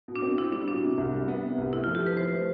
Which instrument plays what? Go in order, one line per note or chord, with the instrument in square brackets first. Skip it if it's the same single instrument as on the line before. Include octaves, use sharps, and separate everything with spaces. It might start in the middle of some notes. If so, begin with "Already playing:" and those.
[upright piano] B2
[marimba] D4
[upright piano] C4
[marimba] E4 [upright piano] F4
[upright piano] G3 [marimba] D4
[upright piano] B2 [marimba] D4
[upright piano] C3
C2
G3
B3
C3
C2
[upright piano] A3 [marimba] E4
[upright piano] F3 [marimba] F4
[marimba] G4
[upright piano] E4 [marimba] B4
[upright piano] F3 [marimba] C5
[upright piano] A3